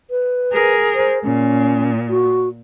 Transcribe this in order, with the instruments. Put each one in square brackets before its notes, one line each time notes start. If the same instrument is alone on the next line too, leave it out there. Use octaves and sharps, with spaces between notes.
[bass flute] B4
[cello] G#4 A#4
[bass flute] C5
[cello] A#2 [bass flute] C#4
[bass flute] F#4